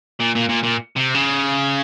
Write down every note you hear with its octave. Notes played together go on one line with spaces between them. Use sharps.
A#2
A#2
A#2
A#2
C3
C#3